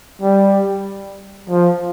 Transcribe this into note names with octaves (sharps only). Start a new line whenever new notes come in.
G3
F3